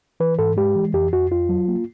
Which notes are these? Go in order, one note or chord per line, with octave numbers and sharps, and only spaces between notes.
E3 B4
G#2 A4
G#3 G4
E3
F2 G4
F2 F#4
F2 F4
F#3
A#3